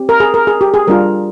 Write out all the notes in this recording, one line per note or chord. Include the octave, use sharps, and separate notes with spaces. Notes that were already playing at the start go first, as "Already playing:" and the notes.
Already playing: C4 G4
A#4
G#4
A#4
G#4
G4
G#4
G3 D4 F4 A#4